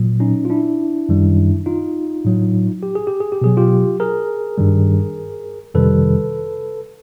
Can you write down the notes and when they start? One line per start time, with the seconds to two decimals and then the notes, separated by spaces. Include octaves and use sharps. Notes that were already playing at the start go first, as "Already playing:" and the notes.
Already playing: A#2 F#3
0.20 C#4 D#4
0.45 F4
0.50 D4 E4
1.09 F#2 D#3 G3
1.66 D#4 F4
2.25 A2 F#3
2.83 G4
2.95 G#4
3.07 G4
3.20 G#4
3.32 G4
3.41 B2 F#3 G#4
3.57 F4 G4
4.00 G#4 A#4
4.58 G2 D#3 G3
5.74 F2 C3 D#3 G3 A4 B4